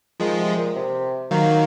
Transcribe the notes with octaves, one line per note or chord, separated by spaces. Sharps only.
D#3 F3 G#3
C3
A#2
C3
D#3 F#3 A#3